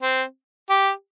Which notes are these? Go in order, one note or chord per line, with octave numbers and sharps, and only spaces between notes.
C4
G4